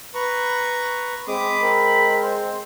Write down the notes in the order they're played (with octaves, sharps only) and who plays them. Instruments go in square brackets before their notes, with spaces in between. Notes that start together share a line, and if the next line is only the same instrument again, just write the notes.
[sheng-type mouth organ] B4 A#5 C#6
[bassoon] G#3 [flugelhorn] C4 [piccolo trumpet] B5 [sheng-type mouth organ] D6 D#6
[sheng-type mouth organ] C4 [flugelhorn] A#4
[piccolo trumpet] C5